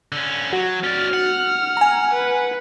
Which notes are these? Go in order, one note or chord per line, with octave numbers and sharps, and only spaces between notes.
D3 C#4
F#3 F#4
C#4 D5 F6
F#5
G#5 A#5
B4